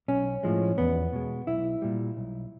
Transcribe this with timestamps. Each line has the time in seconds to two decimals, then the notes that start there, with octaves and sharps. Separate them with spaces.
0.08 B1 C#4
0.43 A2 F3 G#3
0.78 E2 B3
1.13 B2 G#3
1.47 B1 E4
1.82 A#2 G3
2.17 B1